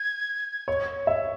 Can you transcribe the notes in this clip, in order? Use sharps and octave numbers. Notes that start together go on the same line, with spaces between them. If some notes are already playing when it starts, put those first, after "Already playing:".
Already playing: G#6
C#5
E5